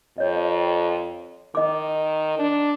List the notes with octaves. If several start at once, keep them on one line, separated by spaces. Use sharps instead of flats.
F2 C#5 D#5
D#3 D#5 D6
D4